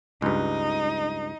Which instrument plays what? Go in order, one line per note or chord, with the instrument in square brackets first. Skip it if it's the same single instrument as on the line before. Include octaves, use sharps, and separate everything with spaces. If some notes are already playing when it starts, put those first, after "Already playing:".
[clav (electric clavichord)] C#2 G2 [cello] D#4